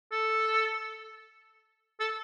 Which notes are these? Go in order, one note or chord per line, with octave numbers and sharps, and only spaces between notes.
A4
A4